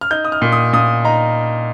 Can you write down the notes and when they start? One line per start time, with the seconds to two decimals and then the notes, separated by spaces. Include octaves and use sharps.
0.01 F6
0.11 D#4 G6
0.25 D#6
0.32 F6
0.42 A#2
0.52 D#6
0.73 A#2 D#6
1.04 D#4 A#5